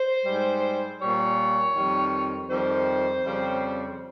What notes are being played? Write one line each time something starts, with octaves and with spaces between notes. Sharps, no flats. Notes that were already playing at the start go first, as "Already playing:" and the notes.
Already playing: C5
G#2 G3
A#2 G3 C#5
F2 D#3 G3
F2 D#3 G3 C5
F2 C#3 G3